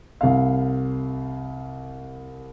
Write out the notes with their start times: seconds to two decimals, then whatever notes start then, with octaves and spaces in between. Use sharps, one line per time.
0.21 C2 F5